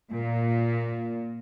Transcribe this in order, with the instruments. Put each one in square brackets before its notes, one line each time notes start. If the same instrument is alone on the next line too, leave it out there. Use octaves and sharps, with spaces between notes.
[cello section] A#2